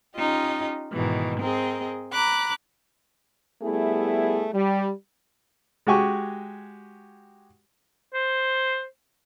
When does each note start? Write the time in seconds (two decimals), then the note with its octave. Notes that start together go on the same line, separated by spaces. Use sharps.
0.15 C#4 D#4 F4 G4 D#5
0.93 G#2 B2 D#3 E3
1.40 C4 G#4 A#4 D#5
2.13 A#5 B5 D6 F#6
3.63 G3 A3 B3 E4 G#4
4.54 G3
5.87 G#3 F#4 G4 G#5 C#6
8.14 C5